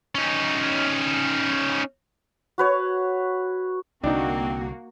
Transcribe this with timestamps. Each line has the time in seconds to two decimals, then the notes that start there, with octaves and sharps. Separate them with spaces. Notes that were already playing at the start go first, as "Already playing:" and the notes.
0.15 C#4 D#4
2.58 F#4 B4 C#5
4.04 C2 D3 A#3 C4 D4 D#4 F#4